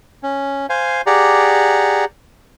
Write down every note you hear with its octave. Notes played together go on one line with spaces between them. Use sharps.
C#4
C5 F5 G#5
G4 G#4 D5 F#5 A#5